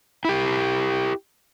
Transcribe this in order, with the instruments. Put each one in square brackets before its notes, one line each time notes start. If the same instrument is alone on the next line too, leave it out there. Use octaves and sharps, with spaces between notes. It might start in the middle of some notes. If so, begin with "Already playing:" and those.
[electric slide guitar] E4 G4